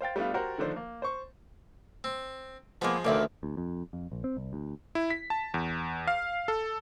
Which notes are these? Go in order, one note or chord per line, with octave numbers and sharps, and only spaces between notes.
C5 F5 G5 A6
G3 A3 B3 D4 F4
F#4 G4 A#4 C5 F#5
D3 D#3 F3 A3 D4 C5
A#3
C5 C#6
C4
F3 G#3 A#3 B3
A1 D2 D#3 A#3 D5 E5
D2
F2
F2
A#1
C4
C2
D2
E4
B6
A5
E2
F5
A4